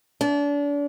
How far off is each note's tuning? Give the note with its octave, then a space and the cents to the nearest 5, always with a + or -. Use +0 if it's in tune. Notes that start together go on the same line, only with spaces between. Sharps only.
D4 -35